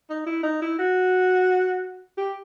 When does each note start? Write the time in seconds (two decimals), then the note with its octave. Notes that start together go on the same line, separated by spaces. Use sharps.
0.10 D#4
0.26 E4
0.43 D#4
0.62 E4
0.79 F#4
2.18 G4